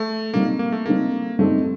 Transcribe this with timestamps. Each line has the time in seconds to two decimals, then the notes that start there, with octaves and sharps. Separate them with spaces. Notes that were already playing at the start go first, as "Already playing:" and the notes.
Already playing: A3
0.33 G3 A#3 C4 D#4 A4
0.59 A#3
0.72 A3
0.86 G3 A#3 C4 D#4 A4
1.39 G3 A3 C4 D#4 A4